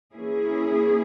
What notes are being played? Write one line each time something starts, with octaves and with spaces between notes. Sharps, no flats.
E3 A#3 C#4 E4 G#4